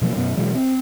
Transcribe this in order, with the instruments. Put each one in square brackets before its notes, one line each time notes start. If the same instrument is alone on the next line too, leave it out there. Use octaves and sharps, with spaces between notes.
[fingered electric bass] B2 F3 F#3 A#3
F#2 B2 B3
B2 E3 F#3 G#3
C4